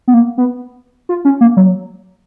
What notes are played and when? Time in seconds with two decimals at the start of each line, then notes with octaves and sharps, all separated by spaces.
0.08 B3
0.14 A#3
0.38 B3
1.09 F4
1.25 C#4
1.41 A#3
1.57 F#3